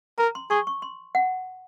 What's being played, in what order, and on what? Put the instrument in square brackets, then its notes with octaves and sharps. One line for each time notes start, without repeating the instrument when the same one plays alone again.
[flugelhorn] A#4 [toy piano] A#5
[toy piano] C6
[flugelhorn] G#4 [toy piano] C#6
[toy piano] C#6
C6
F#5